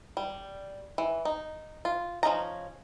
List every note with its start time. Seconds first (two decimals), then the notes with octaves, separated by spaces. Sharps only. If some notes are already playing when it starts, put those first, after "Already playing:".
0.17 G3
0.98 E3
1.25 D#4
1.85 F4
2.23 F3 C#4 D#4 A#5